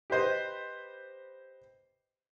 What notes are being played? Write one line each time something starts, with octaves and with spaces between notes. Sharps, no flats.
G4 B4 C5 D#5